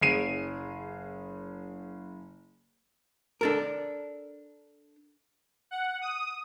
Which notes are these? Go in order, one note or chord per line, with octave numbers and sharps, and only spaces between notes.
F#1 G#4 C7 D#7
D4 A4 A#4
F#5
D#6